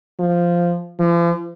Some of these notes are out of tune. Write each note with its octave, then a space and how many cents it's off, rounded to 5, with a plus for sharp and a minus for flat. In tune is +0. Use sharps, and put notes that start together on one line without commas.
F3 -5
F3 -40